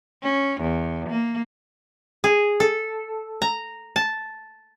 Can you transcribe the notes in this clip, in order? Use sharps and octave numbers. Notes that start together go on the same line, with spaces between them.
C#4
E2
A#3
G#4
A4
A#5
A5